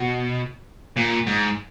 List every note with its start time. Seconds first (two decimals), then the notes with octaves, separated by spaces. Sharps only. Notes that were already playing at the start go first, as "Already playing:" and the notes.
Already playing: B2
0.96 A#2
1.27 G#2